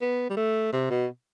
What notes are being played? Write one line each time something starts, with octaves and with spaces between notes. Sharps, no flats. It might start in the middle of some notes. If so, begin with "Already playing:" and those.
B3
G3
A3
C3
B2